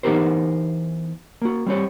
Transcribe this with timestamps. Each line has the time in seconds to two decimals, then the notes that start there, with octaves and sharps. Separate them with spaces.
0.03 E3 B3 D#4 G4 A#4 C5
1.42 A#3 F#4
1.66 G3 C4 G4 C#5